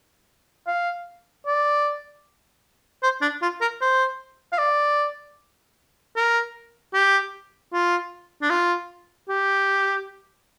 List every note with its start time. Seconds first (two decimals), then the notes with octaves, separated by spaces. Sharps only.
0.67 F5
1.46 D5
3.03 C5
3.21 D4
3.42 F4
3.61 A#4
3.81 C5
4.52 F5
4.58 D5
6.16 A#4
6.94 G4
7.73 F4
8.42 D4
8.50 F4
9.29 G4